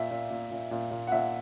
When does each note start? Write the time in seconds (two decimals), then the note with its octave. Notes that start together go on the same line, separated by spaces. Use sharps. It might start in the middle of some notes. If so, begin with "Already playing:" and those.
Already playing: A#2 E5
0.11 A#2
0.30 A#2
0.51 A#2
0.71 A#2
0.91 A#2
1.07 F#5
1.12 A#2 E5